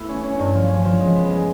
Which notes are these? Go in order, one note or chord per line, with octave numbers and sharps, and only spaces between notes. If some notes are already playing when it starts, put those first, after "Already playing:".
Already playing: A3 B3 E4
C#4
C#4
G2
F3
C#4
F3
G#3
B3
G#3